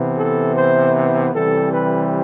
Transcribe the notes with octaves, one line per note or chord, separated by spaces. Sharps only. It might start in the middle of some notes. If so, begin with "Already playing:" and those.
Already playing: C3 E3 B3
A4
C5
C3 E3 G3 C4 A4
B4